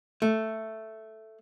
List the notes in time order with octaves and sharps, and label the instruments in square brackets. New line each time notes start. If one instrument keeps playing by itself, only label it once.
[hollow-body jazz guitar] A3